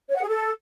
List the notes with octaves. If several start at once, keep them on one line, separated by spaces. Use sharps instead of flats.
C#5
F#5
G#4
A4